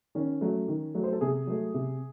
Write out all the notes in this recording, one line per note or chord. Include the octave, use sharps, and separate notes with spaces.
D#3 C#4
F#3 A3
D#3
F#3 A3
C5
A4
C3 G#4
F#3 A3
C3